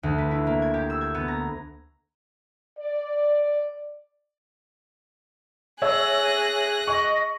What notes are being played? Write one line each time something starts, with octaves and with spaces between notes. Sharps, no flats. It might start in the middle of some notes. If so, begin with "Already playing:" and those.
D2
B4
E4
A#3
G#6
G4
E6
G#6
B3
A#5
D5
G#4 C#5 E5 E6 F#6 A#6
D#5 C#6